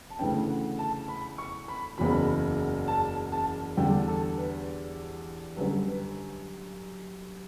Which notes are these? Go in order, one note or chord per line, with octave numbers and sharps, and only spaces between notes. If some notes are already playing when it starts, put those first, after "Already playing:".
A5
D2 C#3 E3 B3 D4 G5
F#5
A5
B5
C#6
B5
F#1 E2 C#3 F#3 B5
A5
A5
E2 D3 G3 D4 G5
A4
B4
F#2 D3 G3 B4
B4